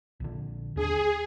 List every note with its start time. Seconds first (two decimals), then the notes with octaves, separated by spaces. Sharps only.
0.20 A#1 D3
0.76 D#2 C#4 D4 G#4